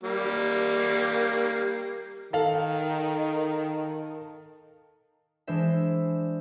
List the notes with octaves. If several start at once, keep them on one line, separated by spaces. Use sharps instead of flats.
G3 A#3
D#3 A4 F5
E3 G#3 D4 C5 E5